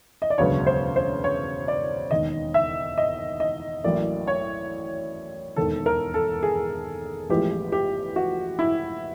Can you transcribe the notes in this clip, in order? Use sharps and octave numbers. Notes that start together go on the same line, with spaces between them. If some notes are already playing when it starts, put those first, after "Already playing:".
D#5
D5
E1 D2 C#3 F#3 B3 C#5
C5
C5
C#5
D5
E1 D#2 D#3 D#5
E5
D#5
D#5
A1 A2 F#3 A#3 D5
C#5
E1 D#2 D#3 A4
A#4
A4
G#4
A1 A2 F3 G#3 B3 G4
G4
F#4
E4